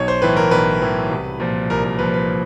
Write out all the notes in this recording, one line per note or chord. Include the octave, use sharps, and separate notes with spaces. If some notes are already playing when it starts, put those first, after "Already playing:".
Already playing: B1 C#5
C5
A2 E3 B4
A#4
B1 B4
A2 E3
C2
A#2 F3
C2 A#4
A#4
A#2 F3 B4
B4